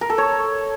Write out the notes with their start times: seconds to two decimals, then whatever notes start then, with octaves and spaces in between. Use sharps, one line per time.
0.01 A#4
0.10 A4
0.18 C#5